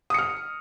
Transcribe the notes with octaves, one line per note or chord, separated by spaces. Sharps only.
D#6 F6 C#7